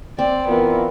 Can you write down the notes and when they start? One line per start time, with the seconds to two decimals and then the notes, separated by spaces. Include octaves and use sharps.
0.18 C4 D5
0.48 E3 B3 F4 A#4